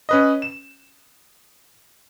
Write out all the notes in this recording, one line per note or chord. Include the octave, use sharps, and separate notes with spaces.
C#4 B4 D#5
E7